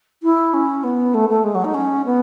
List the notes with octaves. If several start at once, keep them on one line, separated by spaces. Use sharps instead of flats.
E4
C#4
B3
A3
A3
G#3
F#3
D#4
C#4
B3